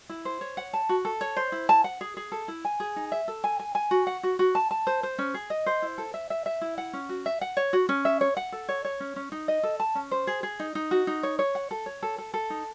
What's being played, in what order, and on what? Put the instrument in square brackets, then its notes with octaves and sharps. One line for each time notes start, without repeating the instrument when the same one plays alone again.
[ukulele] E4
C5
C#5
F#5
A5
F#4
A4
C#5
C5
E4
A5
F#5
G#4
G#4
A4
E4
G#5
G#4
D#4
E5
A4
G#5
G#5
G#5
F#4
F#5
F#4
F#4
A5
A5
C5
C5
C#4
G#4
D#5
C5
E4
A4
E5
E5
E5
E4
F#5
C#4
F#4
E5
F#5
C#5
F#4
C#4
E5
C#5
F#5
A4
C#5
C#5
C#4
C#4
D#4
D#5
A4
A5
C#4
C5
G#4
G#4
D#4
D#4
F#4
D#4
C#5
C#5
F#5
A4
C#5
A4
A4
A4
D#4